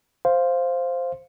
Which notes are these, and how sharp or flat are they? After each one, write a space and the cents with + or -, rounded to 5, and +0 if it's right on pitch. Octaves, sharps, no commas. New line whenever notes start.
C5 +0 F5 +0